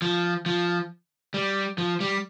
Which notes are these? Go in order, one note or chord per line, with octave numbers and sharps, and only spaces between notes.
F3
F3
G3
F3
G3